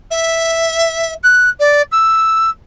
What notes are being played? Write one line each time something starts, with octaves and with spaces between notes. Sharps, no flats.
E5
F#6
D5
E6